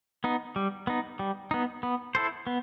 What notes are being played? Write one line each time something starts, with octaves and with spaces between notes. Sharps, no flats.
B3 D#4
G3
B3 D#4
G3
B3 D#4
B3
E4 A4 C5
B3